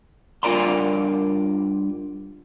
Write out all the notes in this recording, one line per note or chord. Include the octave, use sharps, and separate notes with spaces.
G2 F4 A#4 D5 A#5 C6